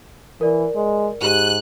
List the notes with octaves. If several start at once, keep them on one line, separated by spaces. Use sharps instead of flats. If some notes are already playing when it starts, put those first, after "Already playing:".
E3 A#4 D5
G#3
G#2 G4 F#6 D#7